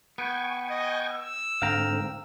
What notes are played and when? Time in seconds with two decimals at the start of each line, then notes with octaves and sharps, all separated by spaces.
0.18 B3 G5 G#5 C#6
0.70 D#5
1.11 E6
1.62 G#2 D3 C4 F5 G5 A#5